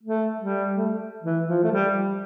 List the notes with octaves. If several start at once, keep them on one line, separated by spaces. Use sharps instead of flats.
A3
G3
A3
E3
F3
A3
G3